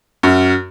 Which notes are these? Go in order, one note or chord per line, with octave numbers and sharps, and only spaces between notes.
F#2